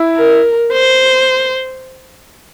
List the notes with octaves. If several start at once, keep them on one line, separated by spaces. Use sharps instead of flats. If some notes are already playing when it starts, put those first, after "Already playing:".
Already playing: E4
A#4
C5